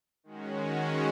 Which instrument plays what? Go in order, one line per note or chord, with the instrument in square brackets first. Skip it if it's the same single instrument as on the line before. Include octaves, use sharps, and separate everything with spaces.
[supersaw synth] D#3 G#3 C#4 F#4